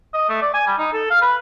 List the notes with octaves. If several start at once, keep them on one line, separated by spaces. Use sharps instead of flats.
D#5
A3
D5
G#5
G3
D#4
A4
F5
B4